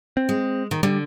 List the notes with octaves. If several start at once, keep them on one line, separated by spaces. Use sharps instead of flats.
C4
G#3
D#3
D3 G3